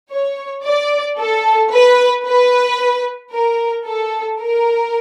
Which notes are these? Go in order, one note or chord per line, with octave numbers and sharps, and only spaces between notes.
C#5
D5
A4
B4
B4
A#4
A4
A#4